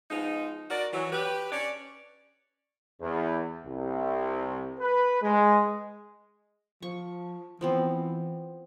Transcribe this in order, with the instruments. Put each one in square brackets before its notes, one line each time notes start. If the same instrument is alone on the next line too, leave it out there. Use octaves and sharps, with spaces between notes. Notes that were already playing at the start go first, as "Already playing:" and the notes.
[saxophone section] F3 G#3 B3 D#4
F#4 A#4 D5
E3 F#3
G4 B4
C#4 C#5 D5
[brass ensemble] E2
C2
B4
G#3
[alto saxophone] F3 [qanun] C#6
[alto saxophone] E3 [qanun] F3 B3 C4